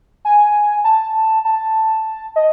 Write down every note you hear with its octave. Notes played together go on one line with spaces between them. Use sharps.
G#5
A5
A5
D#5